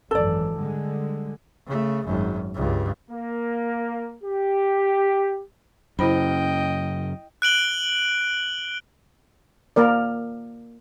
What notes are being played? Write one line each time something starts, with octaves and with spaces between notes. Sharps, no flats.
G#1 F#2 E3 A4 D5
D3 G3 G#3
C#3 A3
G#1 F#2
C#2 G2
A#3
G4
F#2 C#3 E4 C5 D#5 G5 B5
F#6 D7 F#7 G7
A#3 A#4 D5